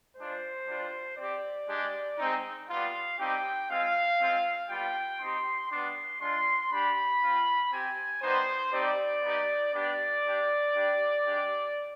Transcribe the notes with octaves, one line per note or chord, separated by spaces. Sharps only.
G#3 D4 F4 C5
G3 D4 F4
C4 G4 D5
G#3 D4 G4
G#3 C4 D#4
G3 B3 F4 F5
G3 C4 D#4 G4 G5
G#3 C4 F4 F5
G#3 C4 F4
G3 B3 F4 G5
C4 D#4 G4 C6
G3 B3 D4 C6
G#3 D4 F4 C6
G3 D4 G4 B5
C4 F4
C4 G4 G#5
G3 B3 D#4 C5
G3 C4 D#4 G4 D5
B3 D#4 G4
B3 D4 G4 D5
G3 D4 G4
G3 D4 G4
G#3 D4 G4